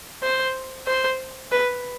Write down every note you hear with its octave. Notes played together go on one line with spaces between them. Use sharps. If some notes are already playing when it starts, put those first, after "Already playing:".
C5
C5
B4